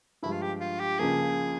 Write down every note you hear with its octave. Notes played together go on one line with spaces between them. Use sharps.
G2 F3 G#3 E4
F4
G4
F4
G4
C#2 C#3 F3 A#3 G#4